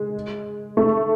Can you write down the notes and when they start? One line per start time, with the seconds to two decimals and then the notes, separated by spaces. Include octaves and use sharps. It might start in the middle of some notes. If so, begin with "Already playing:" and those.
Already playing: G#3
0.77 A3